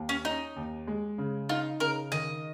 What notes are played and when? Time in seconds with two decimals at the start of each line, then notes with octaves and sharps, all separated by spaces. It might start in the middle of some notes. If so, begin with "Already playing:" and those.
Already playing: D#2
0.09 C#4
0.25 C#4 D#4
0.56 D#2
0.87 G#3
1.18 C#3
1.49 D#4 F4
1.80 C#3 A#4
2.12 D#3 D#5